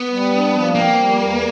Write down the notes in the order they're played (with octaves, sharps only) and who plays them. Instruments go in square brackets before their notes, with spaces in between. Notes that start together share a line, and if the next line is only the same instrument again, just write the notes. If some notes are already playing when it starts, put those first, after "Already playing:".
Already playing: [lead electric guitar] B3
[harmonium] G3
D4
F3
[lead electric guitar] A#3 [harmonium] C4
[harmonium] G3
E2